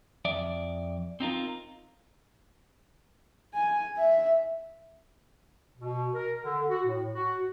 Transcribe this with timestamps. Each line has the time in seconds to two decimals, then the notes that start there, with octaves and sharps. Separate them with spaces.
0.25 F2 D5 E5
1.20 C4 D#4 F4 A#4
3.54 G#5
3.97 E5
5.78 B2
6.14 A#4
6.41 D3
6.70 F#4
6.86 A2
7.14 F#4